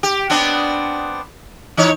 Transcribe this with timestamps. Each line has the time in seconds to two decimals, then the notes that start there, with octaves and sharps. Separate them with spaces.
0.03 G4
0.30 B3 C4 D4
1.77 E3 D#4 C#5